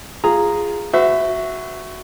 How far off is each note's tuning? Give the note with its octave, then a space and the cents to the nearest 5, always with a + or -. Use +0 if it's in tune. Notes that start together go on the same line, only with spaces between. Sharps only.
F4 +0 G#4 -5 A#5 +0
F#4 +0 C5 -45 E5 +0